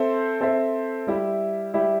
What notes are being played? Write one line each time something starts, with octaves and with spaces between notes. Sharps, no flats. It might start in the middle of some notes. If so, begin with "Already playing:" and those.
Already playing: C4 A4 C5 E5
C4 A4 C5 E5
G3 E4 G4 E5
G3 E4 G4 E5